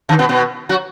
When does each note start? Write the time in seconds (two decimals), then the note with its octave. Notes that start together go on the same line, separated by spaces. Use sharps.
0.09 D#3 D#4
0.19 B2 B3
0.29 B2 B3
0.69 F#3 F#4